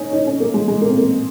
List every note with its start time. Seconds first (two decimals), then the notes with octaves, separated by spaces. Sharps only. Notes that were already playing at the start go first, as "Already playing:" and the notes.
Already playing: C#4 D#4
0.13 D#4
0.27 C#4
0.40 A#3
0.54 G#3
0.68 G#3
0.81 A#3
0.89 C4
0.97 A#3